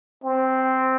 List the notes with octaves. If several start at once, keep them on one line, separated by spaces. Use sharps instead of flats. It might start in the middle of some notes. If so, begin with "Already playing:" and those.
C4